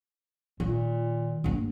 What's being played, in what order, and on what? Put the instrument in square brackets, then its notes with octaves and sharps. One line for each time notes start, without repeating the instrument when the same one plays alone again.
[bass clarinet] A#2 [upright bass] D#3
[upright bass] G2 A#3